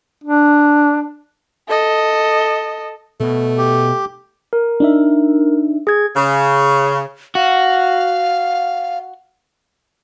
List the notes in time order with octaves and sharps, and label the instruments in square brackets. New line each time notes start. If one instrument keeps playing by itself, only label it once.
[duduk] D4
[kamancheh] A4 D#5
[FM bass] B2 [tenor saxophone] A3
[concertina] G4
[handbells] A#4
[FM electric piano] D4 D#4 E5
[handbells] G#4 G#6
[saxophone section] C#3
[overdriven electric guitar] F#4 [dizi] F5